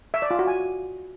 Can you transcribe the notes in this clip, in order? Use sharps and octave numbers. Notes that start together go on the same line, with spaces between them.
E5
D5
F4
F#4
G#5